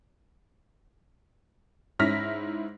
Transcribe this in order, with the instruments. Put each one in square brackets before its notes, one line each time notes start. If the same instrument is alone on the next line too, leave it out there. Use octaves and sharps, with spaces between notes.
[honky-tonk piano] G#2 C#4 E4 F6 A#6 B6